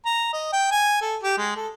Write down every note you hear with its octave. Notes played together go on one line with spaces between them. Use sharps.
A#5
D#5
G5
G#5
A4
G4
G#3
A4